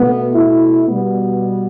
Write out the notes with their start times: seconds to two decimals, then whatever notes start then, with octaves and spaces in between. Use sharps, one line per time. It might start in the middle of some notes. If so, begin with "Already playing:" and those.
Already playing: B2 A3 B3
0.34 E4
0.87 B2 G3 B3